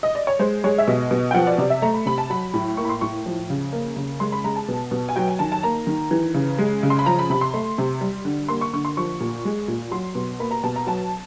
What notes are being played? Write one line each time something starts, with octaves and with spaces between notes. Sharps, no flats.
D#5
D5
C#5
G#3 C5
G#3 C#5
E5
B2 D#5
B2
G5
F3 F#5
D5
C3 D5
E5
A3 A#5
B5
C3 B5
A5
F#3 B5
A2
A#3 C#6
B5
C6
A2 C#6
F3
C#3
A#3
C#3
G#3 C6
B5
G#3 A#5
A5
B2
B2
G#5
F#3 G5
G#5
D#3 A5
A5
A#3 A#5
D#3
E3
C#3
G#3
C#3
C6
B5
F3 A#5
B5
C3 B5
C6
A3
C3
G3
D3
A#3 C6
C#6
D3 C#6
C6
F3 C#6
A#2
G#3
A#2
F#3 C6
B2
A#3 B5
A#5
B2 A5
A#5
F#3 A5